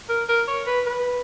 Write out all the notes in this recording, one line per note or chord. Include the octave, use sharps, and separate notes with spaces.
A#4
A#4
C#5
B4
B4